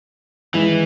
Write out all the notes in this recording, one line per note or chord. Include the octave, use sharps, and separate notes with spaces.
D#3 E3 G#3 C#4 E4